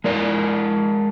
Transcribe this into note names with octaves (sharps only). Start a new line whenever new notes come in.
G#3 A#4 D5